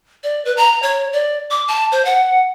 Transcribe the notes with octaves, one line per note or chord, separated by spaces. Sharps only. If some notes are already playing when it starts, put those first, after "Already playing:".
D5
B4
A#5
C#5
D5
D6
A5
C5
F#5